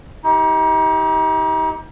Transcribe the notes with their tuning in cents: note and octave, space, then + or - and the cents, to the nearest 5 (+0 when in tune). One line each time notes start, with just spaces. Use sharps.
D#4 +35 G4 -10